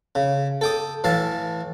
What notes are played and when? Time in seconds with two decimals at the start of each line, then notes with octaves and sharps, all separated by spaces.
0.15 C#3
0.61 A4 G5 D#6
1.04 A2 E3 F5 A5